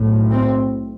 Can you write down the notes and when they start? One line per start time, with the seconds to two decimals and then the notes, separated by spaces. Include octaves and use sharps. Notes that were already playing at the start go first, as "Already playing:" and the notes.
Already playing: B1 A2
0.31 C4